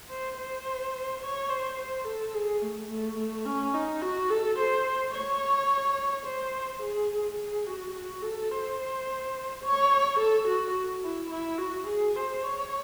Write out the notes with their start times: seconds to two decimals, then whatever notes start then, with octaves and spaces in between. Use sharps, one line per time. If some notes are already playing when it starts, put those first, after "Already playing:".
0.09 C5
0.38 C5
1.22 C#5
1.49 C5
1.77 C5
2.05 A4
2.34 G#4
2.62 A3
2.89 A3
3.18 A3
3.45 C#4
3.74 D#4
4.02 F#4
4.30 A4
4.58 C5
5.13 C#5
6.26 C5
6.82 G#4
7.38 G#4
7.67 F#4
7.95 F#4
8.22 A4
8.51 C5
9.63 C#5
10.19 A4
10.47 F#4
11.03 E4
11.30 E4
11.59 F#4
11.87 G#4
12.16 C5
12.43 C#5